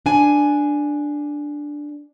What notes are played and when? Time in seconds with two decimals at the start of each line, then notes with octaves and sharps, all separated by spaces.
0.06 D4 G#5